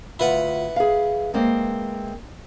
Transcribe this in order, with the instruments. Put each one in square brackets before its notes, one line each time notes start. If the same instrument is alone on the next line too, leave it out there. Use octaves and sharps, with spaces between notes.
[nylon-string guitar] D2 F4 [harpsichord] E4 B4 F#5
[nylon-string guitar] G#4 F5
G#3 A#3 C4